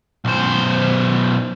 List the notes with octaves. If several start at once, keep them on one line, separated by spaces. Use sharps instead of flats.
B1 C5